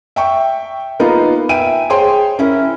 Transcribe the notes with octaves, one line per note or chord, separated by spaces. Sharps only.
E5 G5 C#6
A#3 B3 D#4 F4
E5 G5 G#5 D7 D#7
G#4 C5 C#5 G5 C6
C#4 E4 A#4